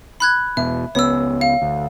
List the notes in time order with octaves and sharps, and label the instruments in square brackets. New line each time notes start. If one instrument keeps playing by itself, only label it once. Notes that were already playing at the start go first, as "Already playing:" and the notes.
[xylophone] B5 F#6 G#6
[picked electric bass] E1 B2 [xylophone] E5
[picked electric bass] C#2 B3 [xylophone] C#5 E6
[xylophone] F5
[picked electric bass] D2